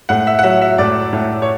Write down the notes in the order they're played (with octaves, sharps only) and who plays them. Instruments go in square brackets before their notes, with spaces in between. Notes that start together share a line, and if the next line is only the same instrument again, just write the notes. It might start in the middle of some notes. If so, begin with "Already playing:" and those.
[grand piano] A2 F#5
E5
F#5
F#3 E5
E5
A2 D5
A2
C#5